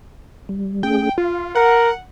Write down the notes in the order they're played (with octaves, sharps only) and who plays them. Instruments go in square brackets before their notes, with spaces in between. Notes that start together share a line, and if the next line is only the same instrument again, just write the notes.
[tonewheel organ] G3
[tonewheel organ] A3 C#4 G#4 [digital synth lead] G5
[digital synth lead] F4 [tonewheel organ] F5
[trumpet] A#4 [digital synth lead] F#5